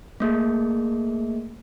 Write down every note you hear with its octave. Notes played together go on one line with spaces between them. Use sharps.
A3 A#3 G#4